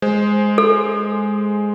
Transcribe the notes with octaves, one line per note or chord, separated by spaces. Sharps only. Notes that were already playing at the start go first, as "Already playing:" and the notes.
G#3 C5
A4